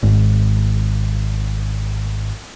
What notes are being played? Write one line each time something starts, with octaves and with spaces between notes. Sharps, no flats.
G#1 G#2